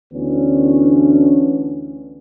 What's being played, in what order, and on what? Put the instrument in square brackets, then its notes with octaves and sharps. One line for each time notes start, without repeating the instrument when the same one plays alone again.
[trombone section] D2 E3 B3 C#4 D4